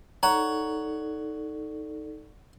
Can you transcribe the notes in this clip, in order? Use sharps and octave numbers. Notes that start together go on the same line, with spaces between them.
D#4 A4 C#5 D5 F#5 A#5